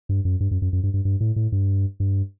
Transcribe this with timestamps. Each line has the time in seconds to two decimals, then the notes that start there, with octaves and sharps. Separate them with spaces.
0.09 G2
0.25 F#2
0.40 G2
0.51 F#2
0.62 F#2
0.73 F#2
0.83 G2
0.94 G2
1.05 G2
1.20 A2
1.36 A2
1.52 G2
2.00 G2